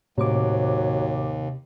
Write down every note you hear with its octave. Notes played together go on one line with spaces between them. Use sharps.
D#2 A2 C3 F#3 C5 D6